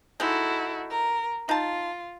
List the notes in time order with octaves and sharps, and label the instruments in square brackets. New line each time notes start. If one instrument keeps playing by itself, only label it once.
[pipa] G#3 D#4 [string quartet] E4 F#4 A4
[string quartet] A#4
[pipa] D#4 A5 [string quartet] F4